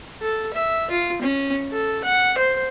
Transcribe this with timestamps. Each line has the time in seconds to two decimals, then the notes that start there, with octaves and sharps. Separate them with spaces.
0.22 A4
0.54 E5
0.90 F4
1.22 C#4
1.72 A4
2.04 F#5
2.38 C5